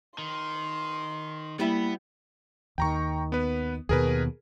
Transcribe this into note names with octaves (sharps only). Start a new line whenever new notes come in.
D#3 C6
G3 A#3 B3 E4
D#2 D#3 G5 A#5 C#6
B3 B4
D#2 B2 G#4 A#4 B4